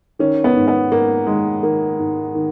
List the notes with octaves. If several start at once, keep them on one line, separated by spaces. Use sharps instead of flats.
D#3 C#4
B3
G#2
B3
G#2 A#3
D#3 G#3
D#3 A#3
G#2
D#3